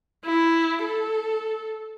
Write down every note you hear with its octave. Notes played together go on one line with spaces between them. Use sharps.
E4
A4